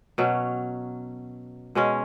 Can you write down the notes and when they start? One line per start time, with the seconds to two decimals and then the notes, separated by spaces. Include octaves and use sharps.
0.18 B2 F#3 C#4
1.75 B2 G#3 C#4